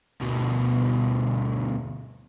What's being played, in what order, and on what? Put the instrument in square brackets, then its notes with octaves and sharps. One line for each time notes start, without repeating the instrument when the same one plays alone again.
[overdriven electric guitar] D2 B2